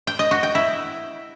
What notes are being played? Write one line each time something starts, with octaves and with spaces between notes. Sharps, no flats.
G5
D#5
F#4
G5
E4